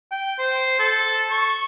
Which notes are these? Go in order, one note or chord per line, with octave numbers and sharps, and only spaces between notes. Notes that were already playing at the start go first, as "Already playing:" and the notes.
G5
C5
A4
C#6